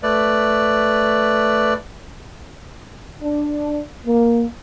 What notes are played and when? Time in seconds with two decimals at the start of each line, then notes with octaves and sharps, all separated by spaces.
0.03 A3 B4 D5
3.22 D4
4.05 A#3